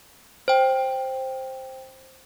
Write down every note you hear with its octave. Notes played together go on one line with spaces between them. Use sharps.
C5 G5